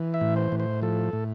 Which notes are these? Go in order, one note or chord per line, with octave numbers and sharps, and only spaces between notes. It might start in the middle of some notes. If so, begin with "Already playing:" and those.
Already playing: E3
E5
A2
C5
A2
C5
F3 A4
A2